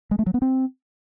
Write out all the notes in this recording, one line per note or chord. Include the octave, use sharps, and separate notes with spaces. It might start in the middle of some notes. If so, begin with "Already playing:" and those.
G#3
A3
F#3
B3
C4